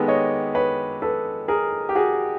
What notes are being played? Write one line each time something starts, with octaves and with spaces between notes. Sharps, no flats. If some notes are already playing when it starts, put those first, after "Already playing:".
Already playing: D#3 G#3 B3 G4 A4
C#5 D#5
B4 C#5
A4 B4
G#4 A#4
G4
F#4 G#4